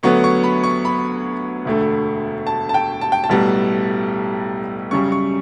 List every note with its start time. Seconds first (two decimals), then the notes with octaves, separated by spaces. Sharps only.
0.03 D2 D3 F#3 B3 C#6
0.24 C#6
0.44 B5
0.64 C#6
0.85 B5
1.65 E1 D2 D3 A3
2.47 A5
2.69 A5
2.74 G5
3.01 A5
3.12 G5
3.24 A5
3.29 B1 A2 G3 B3
4.91 F#2 C#3 G3 C#6
5.12 C#6